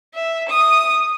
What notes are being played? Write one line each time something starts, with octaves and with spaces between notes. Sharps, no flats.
E5
D#6